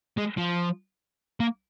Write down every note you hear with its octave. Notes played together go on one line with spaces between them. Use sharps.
G#3
F3
A#3